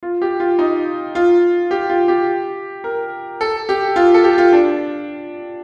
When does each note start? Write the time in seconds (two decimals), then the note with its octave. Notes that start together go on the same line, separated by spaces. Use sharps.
0.03 F4
0.22 G4
0.40 F4
0.59 D#4
1.15 F4
1.71 G4
1.90 F4
2.08 G4
2.84 A#4
3.41 A4
3.69 G4
3.96 F4
4.14 A4
4.24 G4
4.38 F4
4.52 D4